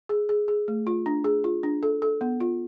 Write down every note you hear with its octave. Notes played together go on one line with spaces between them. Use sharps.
G#4
G#4
G#4
A3
F4
D4
G#4
F4
D4
A4
A4
B3
F4